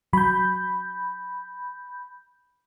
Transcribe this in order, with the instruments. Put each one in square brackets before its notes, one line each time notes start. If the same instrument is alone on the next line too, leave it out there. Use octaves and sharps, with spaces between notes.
[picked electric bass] F#3 [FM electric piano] B5 G6